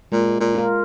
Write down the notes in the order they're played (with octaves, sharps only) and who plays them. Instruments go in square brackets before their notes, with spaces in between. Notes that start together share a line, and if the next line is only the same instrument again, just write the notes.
[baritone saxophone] A#2 [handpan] G#3
[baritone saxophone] A#2
[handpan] F4 A#4